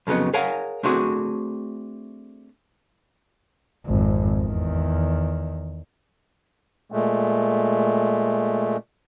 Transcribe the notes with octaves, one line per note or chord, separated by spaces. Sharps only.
F2 C#3 F#3 B3 D#4
G#4 A#4 C#5 F5 F#5 G#5
A3 C4 D4 F#4 G#4
G#1 F2
E2 D#3
A#2 G#3 A3